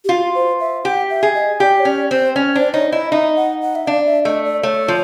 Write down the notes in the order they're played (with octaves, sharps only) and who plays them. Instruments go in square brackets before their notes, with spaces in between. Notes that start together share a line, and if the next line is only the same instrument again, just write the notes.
[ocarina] G4
[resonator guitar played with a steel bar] F4 [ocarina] F#4
[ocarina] C5
E5
[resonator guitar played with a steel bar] G4 [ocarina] F#5
[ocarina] E5
[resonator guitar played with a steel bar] G#4
[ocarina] D#5
[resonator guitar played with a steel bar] G4 [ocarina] D5
[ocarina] C#5
[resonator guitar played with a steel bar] C#4 [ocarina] D5
[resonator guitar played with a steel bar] C4 [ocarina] C5
[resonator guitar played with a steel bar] C#4
[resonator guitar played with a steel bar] D4 [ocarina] C5
[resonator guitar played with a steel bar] D#4 [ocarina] C#5
[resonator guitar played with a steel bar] E4 [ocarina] D#5
[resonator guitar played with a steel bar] D#4 [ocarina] E5
[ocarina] F#5
F#5
E5
[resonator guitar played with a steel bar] D4 [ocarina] F5
[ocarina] E5
[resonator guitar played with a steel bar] A3 [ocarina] D#5
[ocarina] D5
[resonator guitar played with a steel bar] A3 [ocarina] C#5
[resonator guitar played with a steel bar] F3